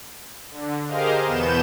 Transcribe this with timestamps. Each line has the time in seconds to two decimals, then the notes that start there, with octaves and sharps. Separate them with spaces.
0.50 D3
0.87 G4 G#4 A#4 C5 D#5 F5
1.24 E2 B2 B3 G6 E7